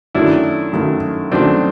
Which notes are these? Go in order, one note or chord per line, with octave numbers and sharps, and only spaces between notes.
F#2 D#3 F#3 A3 D4 E4
F#2 D#3 F#3 A3
F#2 D#3 F#3 A3 C4 D4